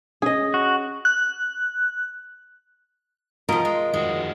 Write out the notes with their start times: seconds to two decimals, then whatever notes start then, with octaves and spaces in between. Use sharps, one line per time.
0.22 C#4 G#4 D#5
0.54 F#4
1.05 F#6
3.49 B2 F3 F4 A#4 D#5
3.65 G#3
3.94 F2 D#3 G#3 F#4